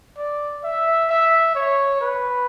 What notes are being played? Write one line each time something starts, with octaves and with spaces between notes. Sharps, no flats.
D5
E5
E5
C#5
B4